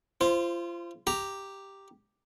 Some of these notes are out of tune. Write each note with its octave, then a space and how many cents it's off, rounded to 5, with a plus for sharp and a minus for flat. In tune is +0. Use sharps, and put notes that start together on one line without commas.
F4 -30 C5 +0
G4 +0 A#5 +0